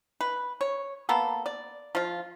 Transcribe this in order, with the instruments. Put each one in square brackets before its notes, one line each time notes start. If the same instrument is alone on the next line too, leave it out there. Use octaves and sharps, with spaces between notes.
[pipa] B4
C#5
A#3 B3 A4
D5
F3 F4